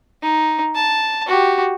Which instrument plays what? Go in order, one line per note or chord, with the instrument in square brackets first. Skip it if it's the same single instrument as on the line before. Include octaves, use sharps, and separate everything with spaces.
[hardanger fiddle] D#4
A5
F#4 G4